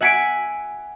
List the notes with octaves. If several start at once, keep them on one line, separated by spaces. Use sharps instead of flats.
E5 F#5 G#5 B6 C#7 D7